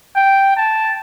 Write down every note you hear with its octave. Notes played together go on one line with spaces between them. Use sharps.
G5
A5